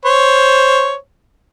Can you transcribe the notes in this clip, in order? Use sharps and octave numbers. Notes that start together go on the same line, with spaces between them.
C5 C#5